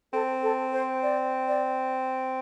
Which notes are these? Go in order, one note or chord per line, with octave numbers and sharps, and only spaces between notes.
C4 A4
A4
C5
D5
D5